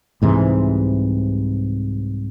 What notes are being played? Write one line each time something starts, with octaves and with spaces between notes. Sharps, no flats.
C2 G#2 C3 E3